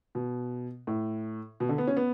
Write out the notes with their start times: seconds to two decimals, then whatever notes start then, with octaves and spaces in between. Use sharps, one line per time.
0.15 B2
0.87 A2
1.60 B2
1.69 D3
1.78 B3
1.87 C#4
1.97 B3